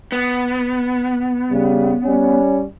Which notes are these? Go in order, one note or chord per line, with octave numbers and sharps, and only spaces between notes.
B3
C#3 G3
G3 C#4